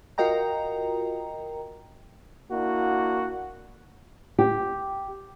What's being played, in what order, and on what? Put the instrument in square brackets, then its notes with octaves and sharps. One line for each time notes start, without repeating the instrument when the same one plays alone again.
[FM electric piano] F4 F#4 A#4 D#5 G5 A#5
[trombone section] A#3 D4 E4 F#4
[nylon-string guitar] G4